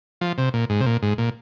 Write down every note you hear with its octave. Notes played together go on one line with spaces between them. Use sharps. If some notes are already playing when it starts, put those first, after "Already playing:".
F3
C3
A#2
G#2
C3
A#2
G#2
A#2